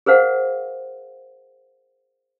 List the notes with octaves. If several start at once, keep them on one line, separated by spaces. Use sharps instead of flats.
G#4 A#4 C5 F5 F#5